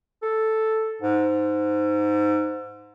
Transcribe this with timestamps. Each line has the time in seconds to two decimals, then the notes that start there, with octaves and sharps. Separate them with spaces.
0.22 A4
1.02 G#2